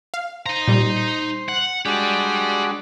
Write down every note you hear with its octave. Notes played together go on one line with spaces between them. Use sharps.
F5
D#4 C5 A#5
A#2 G3
F#5
G#3 D4 F#4 G4 D5